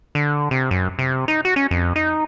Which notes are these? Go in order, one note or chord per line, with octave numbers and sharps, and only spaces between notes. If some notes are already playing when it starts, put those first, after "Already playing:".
D3
C3
F#2
C3
D#4
F#4
C#4
F2
D#4